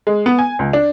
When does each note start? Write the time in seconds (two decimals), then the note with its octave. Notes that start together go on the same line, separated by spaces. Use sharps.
0.07 G#3
0.26 B3
0.39 G#5
0.59 C#2
0.73 D4